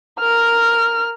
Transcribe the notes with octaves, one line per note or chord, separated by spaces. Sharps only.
A#4 F6